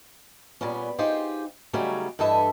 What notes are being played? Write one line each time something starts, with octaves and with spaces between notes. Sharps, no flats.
A#2 G3 B3 C#4
D#4 F4 G4 G#4 C5
C#3 F#3 G3 A3 C#4 D#4
G2 E3 A4 D#5 E5